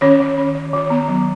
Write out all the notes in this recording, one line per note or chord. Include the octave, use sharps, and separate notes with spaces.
D#3 C#4 C#5
D#3
C#4
D#3
D#3
B3
F#3